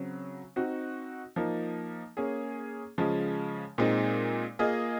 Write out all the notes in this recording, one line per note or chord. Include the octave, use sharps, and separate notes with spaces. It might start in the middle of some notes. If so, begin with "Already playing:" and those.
Already playing: C#3 F#3 C4
C4 D#4 F#4
F3 A#3 D#4
A#3 C#4 G#4
C#3 F3 G#3
A#2 G#3 C4 D#4
A#3 F4 G#4 D#5